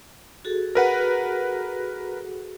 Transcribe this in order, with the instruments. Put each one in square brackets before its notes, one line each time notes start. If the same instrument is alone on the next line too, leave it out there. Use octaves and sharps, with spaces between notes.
[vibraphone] F#4 G#4 A4
[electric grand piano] A#4 B4 F#5